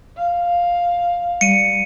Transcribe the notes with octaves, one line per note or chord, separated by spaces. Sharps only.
F5
G3 C#7 D#7